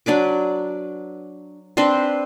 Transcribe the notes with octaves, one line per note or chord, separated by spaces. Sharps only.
F#3 D4 B4 D6
C4 D4 B4 C5